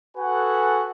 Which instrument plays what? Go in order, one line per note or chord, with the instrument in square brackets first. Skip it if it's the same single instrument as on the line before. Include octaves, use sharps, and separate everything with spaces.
[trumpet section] F#4 G#4 A4 B4 F#5 G#5